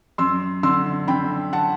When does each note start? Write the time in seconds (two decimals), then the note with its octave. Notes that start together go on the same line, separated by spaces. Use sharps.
0.18 F#2 C6 E6
0.63 D3 C6 E6
1.08 D3 G5 B5
1.53 F#5 A5